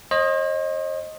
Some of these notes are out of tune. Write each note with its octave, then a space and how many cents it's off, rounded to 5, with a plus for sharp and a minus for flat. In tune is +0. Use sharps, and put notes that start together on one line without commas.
C5 +45 D#5 +0